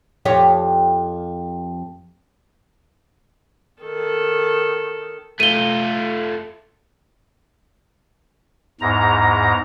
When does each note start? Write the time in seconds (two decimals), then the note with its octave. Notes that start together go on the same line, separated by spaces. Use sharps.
0.25 F2 G4 C#5
3.82 D#3 A4
5.40 A3 F4 D#7 G7
8.81 E2 G#2 A#5